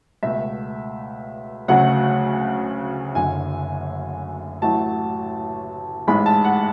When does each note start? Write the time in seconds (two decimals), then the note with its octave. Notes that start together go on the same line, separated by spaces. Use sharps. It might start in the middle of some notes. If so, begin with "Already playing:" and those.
0.23 C#2 B2 A3 E5
1.68 D2 C#3 F#3 A3 F#5
3.15 F#1 F#2 D3 G#5
4.62 A1 A2 F#3 A3 A5
6.07 A1 G#2 G#3 B5
6.26 A5
6.45 F#5